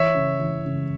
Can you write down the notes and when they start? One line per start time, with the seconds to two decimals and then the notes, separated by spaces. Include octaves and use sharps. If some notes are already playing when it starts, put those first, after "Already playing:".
Already playing: E3 C#5 E5
0.14 C#3
0.39 E3
0.65 C#3